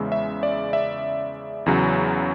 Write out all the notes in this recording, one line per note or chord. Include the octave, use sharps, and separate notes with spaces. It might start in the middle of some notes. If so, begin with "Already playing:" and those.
Already playing: E2 C#3 G#3 E5
E5
D5
E5
E2 C#3 F#3